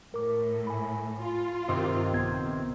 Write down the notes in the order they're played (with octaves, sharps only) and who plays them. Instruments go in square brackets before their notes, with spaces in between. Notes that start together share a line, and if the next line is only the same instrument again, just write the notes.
[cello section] A2 [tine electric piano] A#4 D6
[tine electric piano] G#5 B5
[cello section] F4
[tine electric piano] G2 [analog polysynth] C3 D#3 C4
[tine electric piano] A#1 B3 G#6